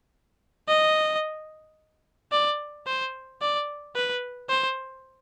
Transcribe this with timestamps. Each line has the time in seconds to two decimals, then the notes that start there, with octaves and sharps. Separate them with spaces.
0.68 D#5
2.32 D5
2.86 C5
3.41 D5
3.96 B4
4.49 C5